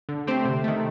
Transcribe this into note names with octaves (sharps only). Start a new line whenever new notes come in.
D3
A3 C4 G4 C5
C3
D#3 A3